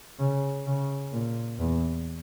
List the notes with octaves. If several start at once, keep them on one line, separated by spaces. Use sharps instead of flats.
C#3
C#3
A#2
E2